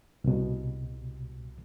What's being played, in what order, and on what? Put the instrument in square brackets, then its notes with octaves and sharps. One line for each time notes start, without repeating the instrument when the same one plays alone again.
[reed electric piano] C2 B2